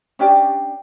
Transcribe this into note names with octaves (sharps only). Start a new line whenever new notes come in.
C#4 D4 G4 D5